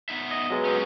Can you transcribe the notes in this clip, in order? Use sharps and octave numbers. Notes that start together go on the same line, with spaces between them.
B3 D#4 E5
D#5
F#3 G#3 B3
C#4 G4